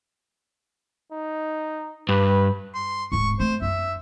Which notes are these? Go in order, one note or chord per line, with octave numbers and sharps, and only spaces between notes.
D#4
G2 B4
C6
D1 G#2 C#6
A3 C4 C5
F#2 D4 E5